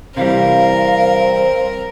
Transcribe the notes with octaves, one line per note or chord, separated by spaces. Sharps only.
C3 E3 G3 C4 A#4 F5